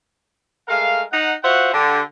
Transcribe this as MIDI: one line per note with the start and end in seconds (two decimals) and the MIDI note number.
0.68 1.02 56
0.68 1.02 57
0.68 1.02 70
0.68 1.02 77
1.12 1.33 63
1.12 1.33 78
1.44 1.73 65
1.44 1.73 66
1.44 1.73 72
1.44 1.73 76
1.44 1.73 78
1.73 2.01 50
1.73 2.01 67